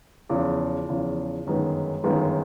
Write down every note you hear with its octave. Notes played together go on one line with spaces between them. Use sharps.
E2 C#3 F3
E2 C#3 F3
G1 F#2 D#3 G#3 B3
G1 F#2 D#3 G#3 B3